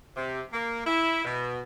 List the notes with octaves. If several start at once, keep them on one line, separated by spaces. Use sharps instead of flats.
C3
A#3
E4
B2